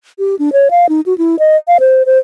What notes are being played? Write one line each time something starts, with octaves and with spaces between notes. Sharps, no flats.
G4
D4
C#5
F5
D#4
F#4
E4
D#5
F5
C5
C5